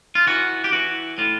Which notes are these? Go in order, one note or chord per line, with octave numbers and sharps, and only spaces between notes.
F4
E3 F#4
G4
E3 F#4
A2 F4